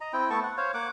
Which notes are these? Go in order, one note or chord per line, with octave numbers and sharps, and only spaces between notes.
D#5 A#5
C4 E4 G5
A3 B3 A5 C#6
F#5
C5 C#5 F5
A#3 F#5 D6